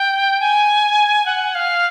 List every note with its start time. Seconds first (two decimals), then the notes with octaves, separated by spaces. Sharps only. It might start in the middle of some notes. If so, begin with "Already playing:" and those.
Already playing: G5
0.40 G#5
1.26 F#5
1.55 F5